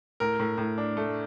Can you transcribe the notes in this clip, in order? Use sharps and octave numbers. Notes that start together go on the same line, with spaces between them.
A2 A#4
A2
A2
D4
A3